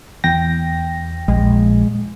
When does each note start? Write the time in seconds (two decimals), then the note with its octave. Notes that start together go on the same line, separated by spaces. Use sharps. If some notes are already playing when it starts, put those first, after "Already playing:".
0.24 E2 G5 A#6
1.28 A#1 G#3